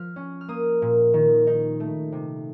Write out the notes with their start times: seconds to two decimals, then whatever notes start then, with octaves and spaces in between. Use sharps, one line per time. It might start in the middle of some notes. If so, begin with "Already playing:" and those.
Already playing: F3 F6
0.16 C#4
0.41 F6
0.48 A#3 D#6
0.82 A#2
1.14 D#3
1.47 D#4
1.80 A3
2.12 C3